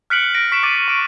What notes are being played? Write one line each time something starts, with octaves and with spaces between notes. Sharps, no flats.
F6 F#6 B6 C#7 D7 F#7
A#6 D7
C#6 B6 D7 E7
D6 A6 D7 D#7
C#6 D7